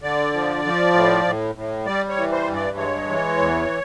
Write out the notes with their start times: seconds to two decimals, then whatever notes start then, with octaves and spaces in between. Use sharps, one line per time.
0.02 D3 D5
0.33 F3
0.64 F3
0.94 A2
1.25 A2
1.55 A2
1.86 G3 D5
2.09 C#5
2.16 E3
2.32 C5
2.48 G2
2.55 D5
2.77 G#3 C#5
3.08 E3
3.38 E2